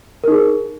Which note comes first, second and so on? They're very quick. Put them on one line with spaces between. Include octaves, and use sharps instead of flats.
A#4 D#4 G#4